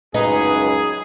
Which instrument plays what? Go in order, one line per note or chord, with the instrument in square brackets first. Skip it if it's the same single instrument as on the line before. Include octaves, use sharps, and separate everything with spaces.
[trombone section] C#2 F#2 [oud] D#4 [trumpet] G#4 [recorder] B4